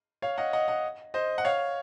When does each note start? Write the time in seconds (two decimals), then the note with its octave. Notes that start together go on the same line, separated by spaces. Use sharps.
0.22 C#5 F5
0.38 D#5 F#5
0.53 D#5 F#5
0.68 D#5 F#5
1.14 C5 D#5
1.38 F#5
1.45 C#5 F5